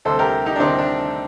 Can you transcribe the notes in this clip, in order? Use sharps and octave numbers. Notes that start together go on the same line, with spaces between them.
D2 C3 G3 A4 C5
G4 A#4
D#4 G4
D4
D2 C3 G3 C4 D#4
D4